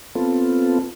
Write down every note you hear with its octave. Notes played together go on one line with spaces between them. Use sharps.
B3 C4 F4 A4